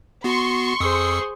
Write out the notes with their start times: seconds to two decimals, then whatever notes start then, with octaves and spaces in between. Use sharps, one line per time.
0.24 B3 F#4 C6 C#6
0.80 F2 G#4 C5 D#6 E6